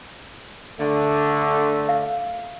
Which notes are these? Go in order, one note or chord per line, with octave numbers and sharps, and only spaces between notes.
D3 A3
F5